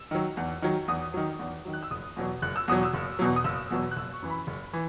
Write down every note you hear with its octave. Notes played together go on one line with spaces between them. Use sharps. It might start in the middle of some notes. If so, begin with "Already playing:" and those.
Already playing: E6
D#3 F#3
E2
D#3 F#3
E2 D#6
D#3 F#3
E2
D#3 F#3
F#6
E6
F#1 D#6
E2 B2 F#3
F#1 F#6
E6
E2 B2 F#3 D#6
E6
F#1
E2 B2 F#3
D#6
F#1 E6
E2 B2 F#3
F#6
F#1 E6
C#6
F#2 E3
B5
F#1
E3